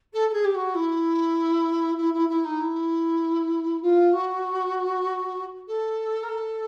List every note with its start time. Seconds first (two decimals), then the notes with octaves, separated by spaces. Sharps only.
0.13 A4
0.29 A4
0.33 G#4
0.44 G4
0.55 F#4
0.74 E4
1.97 E4
2.13 E4
2.28 E4
2.44 D#4
2.60 E4
3.82 F4
4.12 F#4
5.67 A4
6.22 A#4
6.28 A4